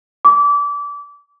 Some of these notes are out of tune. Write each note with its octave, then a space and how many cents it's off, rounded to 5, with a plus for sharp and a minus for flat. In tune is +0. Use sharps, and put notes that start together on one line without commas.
D6 -25